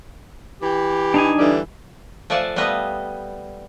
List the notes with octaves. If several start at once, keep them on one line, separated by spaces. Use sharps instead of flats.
E3 G4
D4 D#4 G#5
D3 E3 G3
F3 A3 D5 F#5 G#5 A5
G3 A3 B3 B4 D#5